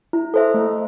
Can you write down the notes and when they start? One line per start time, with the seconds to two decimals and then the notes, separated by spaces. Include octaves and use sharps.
0.13 E4
0.34 A4 C5 E5
0.54 A3